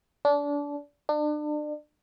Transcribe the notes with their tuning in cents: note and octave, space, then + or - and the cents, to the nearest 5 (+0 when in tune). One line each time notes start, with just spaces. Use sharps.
D4 -25
D4 +35